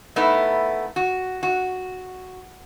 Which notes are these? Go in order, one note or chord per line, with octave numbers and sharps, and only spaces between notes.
A3 B3 D#4 E4
F#4
F#4